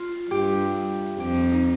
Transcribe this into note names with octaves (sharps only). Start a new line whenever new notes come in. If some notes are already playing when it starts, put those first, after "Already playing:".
Already playing: F4
G2 G4
F2 G4
D#4